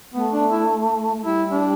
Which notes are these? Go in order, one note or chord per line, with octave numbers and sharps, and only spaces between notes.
A3 B3
D4
E4
A3
G3 E4
D4